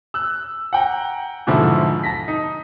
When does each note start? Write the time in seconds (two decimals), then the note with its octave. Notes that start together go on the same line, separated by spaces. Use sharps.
0.14 E6 F#6
0.73 F#5 G5 A#5
1.47 G#2 B2 D3 E3 F3 E4
2.04 A5 A#6 B6
2.28 D#4